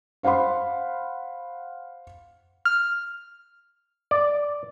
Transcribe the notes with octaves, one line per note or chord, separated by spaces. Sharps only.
C5 F5 F#5 B5 C6
F6
D5